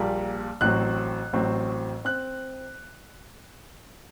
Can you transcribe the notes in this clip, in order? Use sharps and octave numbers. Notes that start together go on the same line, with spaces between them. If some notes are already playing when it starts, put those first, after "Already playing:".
Already playing: A#1 A#2 G3 A#3
A1 A2 F#3 C4 F#6
A1 A2 F#3 C4
C4 F#6